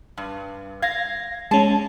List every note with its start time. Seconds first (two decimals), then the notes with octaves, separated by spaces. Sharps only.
0.18 G2
0.82 F5 G#6 A#6
1.51 G#3 C#4 A5